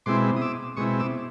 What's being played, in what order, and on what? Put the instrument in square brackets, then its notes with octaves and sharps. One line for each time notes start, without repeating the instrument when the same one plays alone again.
[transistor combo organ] B2 G#3 C4 E4 C6 D6
D#6
D6 E6
B2 G#3 C4 E4 C#6 D#6
D6 E6